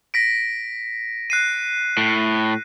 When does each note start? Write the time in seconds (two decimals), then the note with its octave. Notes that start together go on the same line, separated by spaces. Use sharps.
0.14 A#6 B6 D7
1.30 F#6 C7 D#7
1.97 A2